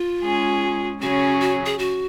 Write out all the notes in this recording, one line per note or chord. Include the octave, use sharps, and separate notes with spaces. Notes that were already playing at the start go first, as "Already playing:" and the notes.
Already playing: F4
G#3 C#4 G#4
C#3 F#3 C#4 F#4 G#4
F#4
G#4
F#4